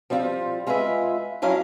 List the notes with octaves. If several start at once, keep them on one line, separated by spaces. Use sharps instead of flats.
F3 G3 C4 F4
G#3 F4 G#4 B4 E5
F2 F#3 C#4 E4 F5